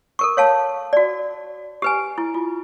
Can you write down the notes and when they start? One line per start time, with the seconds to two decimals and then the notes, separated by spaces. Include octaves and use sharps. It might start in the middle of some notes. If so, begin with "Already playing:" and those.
0.19 A4 A#4 C#6
0.37 C#5 F5 A5
0.93 F#4 D5
1.82 G4 B4 G#5
2.18 E4
2.34 F4